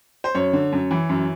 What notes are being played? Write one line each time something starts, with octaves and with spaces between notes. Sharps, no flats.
C5
F#2 C#5
D3
F#2
E3
F#2